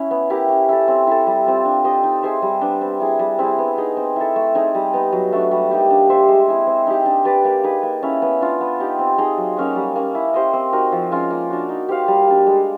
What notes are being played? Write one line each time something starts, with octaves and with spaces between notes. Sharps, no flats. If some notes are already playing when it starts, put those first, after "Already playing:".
Already playing: C#4 E4
B3
E4 G4 A#4
C#4
E4 A4
C4
E4 A4
G3
C4 F4
D4
G4 C5 D#5
D#4
G#4 C5 E5
G3
B3 D4
C4
E4 G#4
G3
C4 E4 G#4
B3
D#4 G#4
C4
E4 A4
A3
C4 D#4 G#4
G3
B3 D#4
F#3
A3 D4 F#4
G3
A#3 D#4 G4
D4
G4 C5 E5
G#3
C4 E4 G#4
C4
D#4 G4
D4
G4 B4 D5
A#3
D#4 G#4 B4
A#3
C#4 E4
B3
D4 F4
B3
D#4 G4
C4
D#4 G#4
F#3
A#3 C#4 F#4
G3
A#3 C#4
E4
G4 C5 D#5
C4
D#4 F#4 A#4
F3
G#3 C#4 F4
A#3
D4 F#4
D#4
G4 C5 F5
G3
A#3 D4
G#3